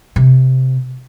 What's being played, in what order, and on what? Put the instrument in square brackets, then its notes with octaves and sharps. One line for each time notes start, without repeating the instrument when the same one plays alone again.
[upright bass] C3